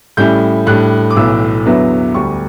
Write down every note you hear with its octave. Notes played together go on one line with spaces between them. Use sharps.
A2 G3 C#4 E4 G6
A2 G3 D4 F#6
D6
B1 A2 E3 E6
E2 D3 F#3 B3 E4
D2 D3 G3 C#6